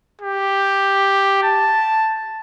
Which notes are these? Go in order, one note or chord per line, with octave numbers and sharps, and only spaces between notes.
G4
A5